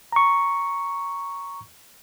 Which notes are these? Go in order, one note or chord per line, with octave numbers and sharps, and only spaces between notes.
A#5 C#6